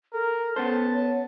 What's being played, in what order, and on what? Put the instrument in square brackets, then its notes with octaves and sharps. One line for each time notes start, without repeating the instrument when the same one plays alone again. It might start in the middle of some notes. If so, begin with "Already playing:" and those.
[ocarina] A4 [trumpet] A#4
[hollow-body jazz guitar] B3 C#4 C5 [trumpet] A5
[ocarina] C#5